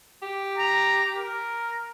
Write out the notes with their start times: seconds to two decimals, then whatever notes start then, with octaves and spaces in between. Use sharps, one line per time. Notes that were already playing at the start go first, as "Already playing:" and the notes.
0.22 G4
0.58 A#5
1.16 A#4